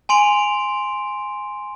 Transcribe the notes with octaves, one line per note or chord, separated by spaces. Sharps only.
G#5 C6 D7 F7